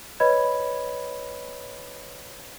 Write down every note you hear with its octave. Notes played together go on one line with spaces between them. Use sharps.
B4 C#5 D#5 B5 G#6